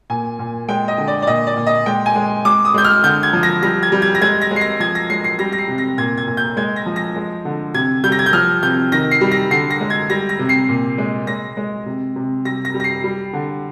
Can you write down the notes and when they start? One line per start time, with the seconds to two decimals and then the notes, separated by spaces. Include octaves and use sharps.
0.10 A#2 G#5
0.39 A#2
0.69 G#3 G5
0.88 D#5
0.98 D3
1.08 D5
1.22 D5
1.27 A#2 D#5
1.47 D5
1.57 A#2
1.66 D#5
1.86 G#3 G5
2.06 G#5
2.16 G#3
2.45 G#3 D6
2.65 D#6
2.74 G#3 G6
2.84 F6
3.04 D3 G6
3.23 G#6
3.33 F3
3.43 A#6
3.63 G3 A#6
3.83 G#6
3.92 G3
4.02 G#6
4.15 A#6
4.21 G#3 G#6
4.41 A#6
4.51 G#3
4.56 C7
4.61 A#6
4.80 F3 G#6
4.95 A#6
5.10 G#3 C7
5.24 C7
5.39 G3 A#6
5.53 A#6
5.58 C7
5.68 C3
5.78 A#6
5.98 A#2 G#6
6.18 G#6
6.27 A#2
6.37 G6
6.57 G#3 G#6
6.76 A#6
6.86 F3
6.96 A#6
7.16 G#3
7.45 D3
7.74 C3 G#6
8.04 G3 G6
8.12 A#6
8.19 G#6
8.26 G6
8.33 F3 F6
8.63 C3 G6
8.92 D#3 A#6
9.11 C7
9.21 G3
9.31 A#6
9.51 D3 C7
9.71 A#6
9.80 G#3
9.90 G#6
10.10 G3 A#6
10.29 A#6
10.39 C3
10.49 C7
10.69 A#2
10.98 G#3
11.27 G#3 A#6
11.57 G#3
11.86 C3
12.16 C3
12.45 G3 A#6
12.65 A#6
12.74 G3
12.80 A#6
12.84 C7
13.04 G3
13.33 D3